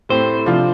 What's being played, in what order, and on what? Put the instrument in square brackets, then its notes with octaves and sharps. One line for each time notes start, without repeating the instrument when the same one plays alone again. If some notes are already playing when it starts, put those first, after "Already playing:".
[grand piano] A2 A3 C4 G4 [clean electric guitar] C5
[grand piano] C3 F3 D4 F4